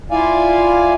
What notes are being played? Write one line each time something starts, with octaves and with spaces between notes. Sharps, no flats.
E4 F4 D5 F5 G#5